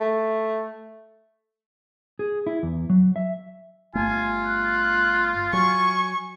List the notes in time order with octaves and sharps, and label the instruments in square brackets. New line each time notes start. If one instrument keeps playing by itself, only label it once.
[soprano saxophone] A3
[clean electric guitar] G#4
E4
E2
F#3
E5
[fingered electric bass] G1 A3 [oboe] F4 [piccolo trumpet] G#5
[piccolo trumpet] F#6
[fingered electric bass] F#3 [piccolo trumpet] G#5 [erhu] C#6